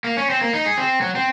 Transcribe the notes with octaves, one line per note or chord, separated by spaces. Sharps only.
A#3
C#4
C4
A#3
D#4
G#4
C4
F#3
C4